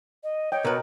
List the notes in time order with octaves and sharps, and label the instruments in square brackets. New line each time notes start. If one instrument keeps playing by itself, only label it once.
[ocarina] D#5
[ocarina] C#5 [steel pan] D#5 G5
[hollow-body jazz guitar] B2 B4 [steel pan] A#4